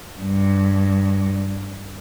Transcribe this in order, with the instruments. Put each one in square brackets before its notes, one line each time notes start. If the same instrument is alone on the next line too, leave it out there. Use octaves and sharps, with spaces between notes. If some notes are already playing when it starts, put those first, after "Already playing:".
[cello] G2